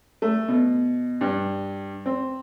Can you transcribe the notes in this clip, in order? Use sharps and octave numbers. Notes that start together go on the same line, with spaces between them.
A3
B2
G2
C4